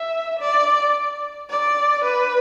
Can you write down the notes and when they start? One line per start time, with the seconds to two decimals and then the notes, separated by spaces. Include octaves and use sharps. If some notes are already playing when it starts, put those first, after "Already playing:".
Already playing: E5
0.39 D5
1.50 D5
2.04 B4